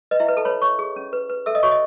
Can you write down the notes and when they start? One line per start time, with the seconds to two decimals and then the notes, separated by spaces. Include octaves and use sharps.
0.11 B4 D#5
0.20 E4 E5
0.28 B4
0.37 A4 A5
0.45 B4 C#5 B5
0.62 C#5 C#6
0.79 G#4
0.96 C#4
1.13 B4
1.30 B4
1.46 A4 E5 E6
1.55 D#5 D#6
1.63 F#4 C#5 C#6
1.71 D#5